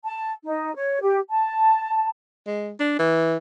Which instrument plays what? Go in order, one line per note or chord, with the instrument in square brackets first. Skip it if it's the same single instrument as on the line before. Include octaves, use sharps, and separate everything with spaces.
[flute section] A5
D#4
C#5
G4
A5
[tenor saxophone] G#3
D4
E3